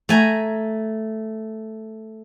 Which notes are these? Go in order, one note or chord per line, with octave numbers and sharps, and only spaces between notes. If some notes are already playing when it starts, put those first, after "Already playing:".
A3 G#5 A#5